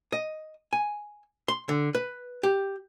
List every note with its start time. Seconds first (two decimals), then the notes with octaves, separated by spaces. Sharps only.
0.12 D#5
0.73 G#5
1.48 C6
1.69 D3
1.95 B4
2.43 G4